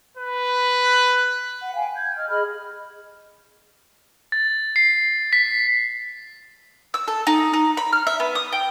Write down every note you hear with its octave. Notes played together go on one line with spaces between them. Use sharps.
B4
F#5
F5 G5 G#5
G6 G#6
D#5 F6
G#4 D#5 B5 F6
A6
C7
B6
E6
A4
D#4
D#4
B5
F6
E5
B3
D#6
G5